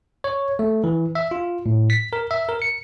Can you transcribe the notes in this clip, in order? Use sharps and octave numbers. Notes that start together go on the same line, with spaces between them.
C#5
A3
E3
E5
F4
A2
B6
A#4
E5
A#4
C#7